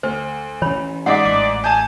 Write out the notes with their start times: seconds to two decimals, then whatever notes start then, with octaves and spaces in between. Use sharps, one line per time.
0.03 D2 C5
0.62 E3 C#4 C#5 B5
1.06 G#2 D5 D#5 F#5 D6 B6
1.26 A1 D6
1.64 G#5 A5 G6